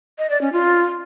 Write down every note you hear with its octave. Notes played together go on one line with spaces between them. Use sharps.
D#5
D5
C#4
F4